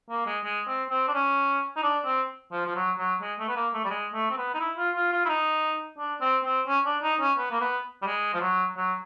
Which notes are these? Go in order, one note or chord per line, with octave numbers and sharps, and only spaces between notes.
A#3
G#3
G#3
C4
C4
D4
C#4
D#4
D4
C4
F3
F3
F#3
F#3
G#3
A3
B3
A#3
A3
G3
G#3
A3
C4
B3
D#4
E4
F4
F4
F4
E4
D#4
D4
C4
C4
C#4
D4
D#4
C#4
B3
A#3
B3
G3
G#3
F3
F#3
F#3